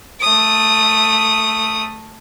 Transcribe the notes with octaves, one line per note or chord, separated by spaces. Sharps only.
A3 D#6